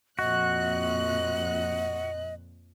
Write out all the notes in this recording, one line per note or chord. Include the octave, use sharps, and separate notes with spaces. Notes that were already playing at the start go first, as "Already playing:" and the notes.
F2 A#2 F#4 D#5 F#6